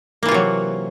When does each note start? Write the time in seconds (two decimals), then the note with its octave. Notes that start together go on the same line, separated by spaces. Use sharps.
0.23 A#3
0.26 E3
0.28 F4
0.31 C3
0.34 F#3